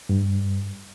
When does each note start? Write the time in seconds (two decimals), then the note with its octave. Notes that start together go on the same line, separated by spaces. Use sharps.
0.09 G2